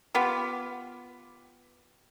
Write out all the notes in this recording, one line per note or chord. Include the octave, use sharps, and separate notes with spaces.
B3 F4 G4